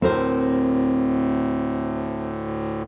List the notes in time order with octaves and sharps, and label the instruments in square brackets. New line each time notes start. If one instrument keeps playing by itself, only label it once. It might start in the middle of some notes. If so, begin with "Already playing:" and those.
[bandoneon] D2 A2 [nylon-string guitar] C4 A#4 C5